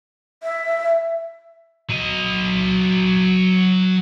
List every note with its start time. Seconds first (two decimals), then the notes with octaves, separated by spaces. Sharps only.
0.43 E5
1.90 F#3 D#5